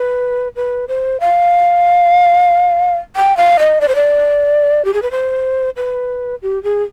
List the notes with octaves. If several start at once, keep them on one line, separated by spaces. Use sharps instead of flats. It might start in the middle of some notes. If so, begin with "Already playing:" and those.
Already playing: B4
B4
C5
F5
G5
F5
D#5
D5
C5
D5
G4
G#4
B4
C5
B4
G4
G#4